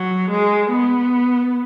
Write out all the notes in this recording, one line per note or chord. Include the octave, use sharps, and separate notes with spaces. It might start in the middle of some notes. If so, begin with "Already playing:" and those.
Already playing: F#3
G#3
B3